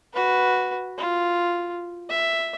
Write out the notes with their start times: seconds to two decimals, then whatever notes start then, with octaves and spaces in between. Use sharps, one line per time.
0.13 F#4 B4
0.98 F4
2.10 E5